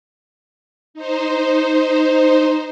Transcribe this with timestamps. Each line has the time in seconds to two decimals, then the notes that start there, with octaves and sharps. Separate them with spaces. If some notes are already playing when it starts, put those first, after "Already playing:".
0.94 D#4 C5